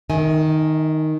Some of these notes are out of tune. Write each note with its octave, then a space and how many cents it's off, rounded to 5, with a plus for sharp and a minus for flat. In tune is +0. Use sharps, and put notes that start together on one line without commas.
D#3 +0 E5 -45 G#5 +0